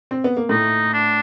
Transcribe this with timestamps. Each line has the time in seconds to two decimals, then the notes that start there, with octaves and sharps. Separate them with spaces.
0.11 C4
0.24 B3
0.37 A#3
0.49 A2 A3 D#4
0.93 D4